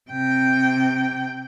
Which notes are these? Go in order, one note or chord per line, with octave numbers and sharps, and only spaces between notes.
C3 G5